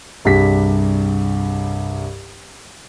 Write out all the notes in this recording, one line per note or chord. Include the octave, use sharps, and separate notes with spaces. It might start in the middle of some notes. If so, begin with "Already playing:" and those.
C2 G2 G4 G#4 B6